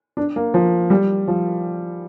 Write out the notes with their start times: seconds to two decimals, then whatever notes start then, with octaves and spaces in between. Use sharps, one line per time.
0.17 D4
0.36 A#3
0.54 F3
0.90 G3
1.28 F3